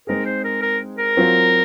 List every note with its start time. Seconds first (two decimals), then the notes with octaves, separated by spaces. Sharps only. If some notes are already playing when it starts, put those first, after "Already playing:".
0.07 G#3 C4 D#4 G#4 A#4
0.25 C5
0.44 A#4
0.62 A#4
0.98 A#4
1.17 F#3 C4 F4